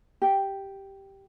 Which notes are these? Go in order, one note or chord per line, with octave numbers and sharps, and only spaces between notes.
G4